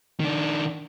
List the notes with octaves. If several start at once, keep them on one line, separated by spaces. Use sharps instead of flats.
D#3 D4